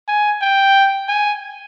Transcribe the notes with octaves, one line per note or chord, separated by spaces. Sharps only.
G#5
G5
G#5